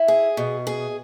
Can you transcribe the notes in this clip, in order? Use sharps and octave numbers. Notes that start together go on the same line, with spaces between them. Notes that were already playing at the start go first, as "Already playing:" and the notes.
Already playing: E4
G#4
B2
G#4